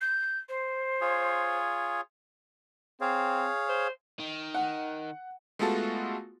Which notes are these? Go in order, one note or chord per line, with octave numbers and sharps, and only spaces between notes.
G6
C5
F4 G#4 C#5
C4 G#4 C#5 F5
C5
D#3
F#5
G#3 A3 B3 F4 F#4 A4